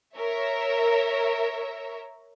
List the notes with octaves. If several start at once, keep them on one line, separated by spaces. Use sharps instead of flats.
A#4 C#5 E5